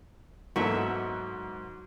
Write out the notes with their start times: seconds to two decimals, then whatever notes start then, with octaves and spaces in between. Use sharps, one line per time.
0.56 G#2 F#3 A#3 B3 A4 E5